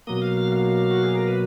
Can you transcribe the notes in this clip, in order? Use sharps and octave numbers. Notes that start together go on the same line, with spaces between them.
B2 F#3 A#3 D#6
F5
F5
F5
F#4
G#4
A#4
B4